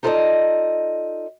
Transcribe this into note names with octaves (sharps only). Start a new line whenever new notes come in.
D#4 F4 A4 C5 D5 D#5